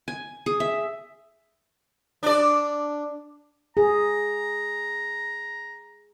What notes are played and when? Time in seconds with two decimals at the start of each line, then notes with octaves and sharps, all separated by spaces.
0.08 G#5
0.46 G#4
0.60 E5
2.23 D4 D5
3.77 G#4 A#5